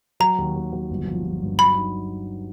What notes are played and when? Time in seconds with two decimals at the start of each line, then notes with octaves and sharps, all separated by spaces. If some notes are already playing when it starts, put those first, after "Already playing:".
0.20 F#3 A#5
0.38 D#2
0.56 D#2
0.73 F#3
0.90 G1
1.07 F3
1.25 F3
1.42 G2
1.59 F#3 B5
1.76 D#4